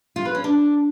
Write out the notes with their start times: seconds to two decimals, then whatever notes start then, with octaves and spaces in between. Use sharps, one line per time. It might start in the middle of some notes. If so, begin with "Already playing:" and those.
0.16 F4
0.25 B4
0.35 C#4
0.44 D4